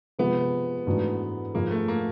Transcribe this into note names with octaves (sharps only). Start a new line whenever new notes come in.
C3 F3 G#3 B3
G#2 E3 A3 D4 F#4
G#2 F3 G#3 A#3
A3
A#3